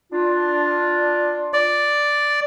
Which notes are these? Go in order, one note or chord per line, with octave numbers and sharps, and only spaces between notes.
D4 F4
D5